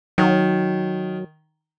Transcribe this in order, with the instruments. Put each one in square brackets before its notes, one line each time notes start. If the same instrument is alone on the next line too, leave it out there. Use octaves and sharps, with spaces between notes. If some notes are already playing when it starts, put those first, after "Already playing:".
[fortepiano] D#3 [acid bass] F#3